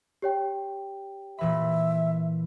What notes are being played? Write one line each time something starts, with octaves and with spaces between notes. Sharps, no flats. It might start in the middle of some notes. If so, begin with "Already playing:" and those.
G4 C#5 G5
A#2 E3 E5 B5